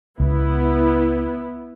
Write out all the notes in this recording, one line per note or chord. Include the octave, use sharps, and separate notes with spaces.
C#2 B3 E4